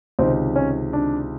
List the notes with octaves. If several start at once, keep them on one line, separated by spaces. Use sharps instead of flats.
C#2 C3 D#3 C4
C#4
D4